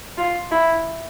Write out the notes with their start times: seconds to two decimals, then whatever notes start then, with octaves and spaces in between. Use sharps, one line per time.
0.17 F4
0.51 E4